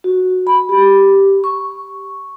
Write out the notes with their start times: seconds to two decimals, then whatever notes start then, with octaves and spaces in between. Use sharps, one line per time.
0.04 F#4
0.47 B5
0.69 G4
1.44 C#6